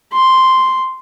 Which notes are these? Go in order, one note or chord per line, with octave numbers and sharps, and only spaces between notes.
C6